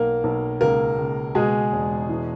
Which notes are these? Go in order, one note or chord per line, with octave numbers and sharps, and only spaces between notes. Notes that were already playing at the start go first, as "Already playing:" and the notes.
Already playing: B1 A#3 A#4
B1
C#2 A#3 A#4
C#2
B2 G#3 G#4
E1
E3